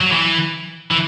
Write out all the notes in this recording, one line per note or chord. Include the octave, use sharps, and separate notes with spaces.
F#3
E3
E3